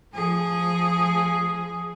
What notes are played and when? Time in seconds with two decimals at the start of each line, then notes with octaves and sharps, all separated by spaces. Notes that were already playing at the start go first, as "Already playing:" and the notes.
0.14 F3 G#4